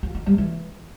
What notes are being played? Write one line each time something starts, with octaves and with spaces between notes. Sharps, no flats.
F4
D#4
G3
E3